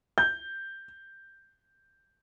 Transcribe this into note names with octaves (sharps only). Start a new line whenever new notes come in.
G6